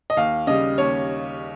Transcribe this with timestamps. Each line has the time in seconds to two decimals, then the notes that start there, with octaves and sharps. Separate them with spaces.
0.10 D#5
0.17 D#2 F5
0.47 C#3 G3 D#5
0.78 D#2 C#5